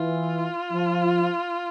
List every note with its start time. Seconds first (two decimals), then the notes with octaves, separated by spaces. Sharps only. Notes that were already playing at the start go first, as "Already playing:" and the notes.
Already playing: E3 F4
0.72 F3